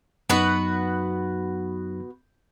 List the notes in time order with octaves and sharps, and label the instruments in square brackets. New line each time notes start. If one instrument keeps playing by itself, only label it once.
[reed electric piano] F#2 F#3 D#4 [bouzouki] B3 F#4 B4